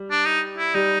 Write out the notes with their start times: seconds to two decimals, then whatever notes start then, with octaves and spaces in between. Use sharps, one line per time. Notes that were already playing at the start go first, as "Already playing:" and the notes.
Already playing: G3
0.10 D4
0.26 D#4
0.58 E4
0.74 G3 D#4